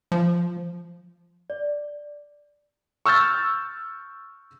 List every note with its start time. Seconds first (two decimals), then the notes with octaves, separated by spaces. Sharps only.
0.12 F3
1.50 D5
3.06 C#6 E6 F6 G6 A6